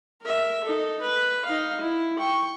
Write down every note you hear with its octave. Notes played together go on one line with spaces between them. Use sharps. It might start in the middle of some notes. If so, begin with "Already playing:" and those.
A#4 E5
D#4 A4
B4
D#4 F5
E4
G5 C#6